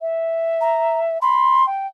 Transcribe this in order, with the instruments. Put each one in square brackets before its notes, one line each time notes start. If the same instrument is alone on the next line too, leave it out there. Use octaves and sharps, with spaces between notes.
[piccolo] E5
[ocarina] A#5
[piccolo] B5 [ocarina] C6
[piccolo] G5